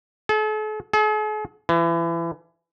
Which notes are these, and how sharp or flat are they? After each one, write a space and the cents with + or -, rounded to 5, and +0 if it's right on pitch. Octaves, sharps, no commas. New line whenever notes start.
A4 -45
G#4 +45
E3 +30